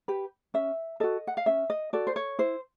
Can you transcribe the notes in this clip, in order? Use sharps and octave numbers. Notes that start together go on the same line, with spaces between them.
G4 B4
C#4 E5
F#4 A4 D#5
F#5
F5
C#4 E5
D#5
F#4 A4 D5
C5
C#5
E4 C5